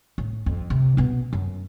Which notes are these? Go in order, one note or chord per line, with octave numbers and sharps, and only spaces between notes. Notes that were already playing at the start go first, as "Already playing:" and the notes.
A2
F2
C3
B2 B3
F#2